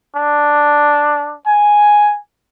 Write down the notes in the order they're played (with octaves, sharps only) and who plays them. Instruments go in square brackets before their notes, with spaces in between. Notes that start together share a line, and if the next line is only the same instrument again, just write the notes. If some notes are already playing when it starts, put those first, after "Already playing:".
[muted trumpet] D4
G#5